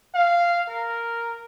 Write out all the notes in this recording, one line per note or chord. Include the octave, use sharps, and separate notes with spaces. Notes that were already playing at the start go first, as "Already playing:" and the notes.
F5
A#4